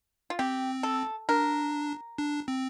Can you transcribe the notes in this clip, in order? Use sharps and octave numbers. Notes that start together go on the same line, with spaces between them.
F4
C4 G4
A4
D4 A#4
D4
C4